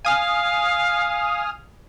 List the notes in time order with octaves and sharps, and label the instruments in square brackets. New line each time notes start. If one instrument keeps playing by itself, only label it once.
[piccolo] F5 [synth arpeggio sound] G#5 D#6 F6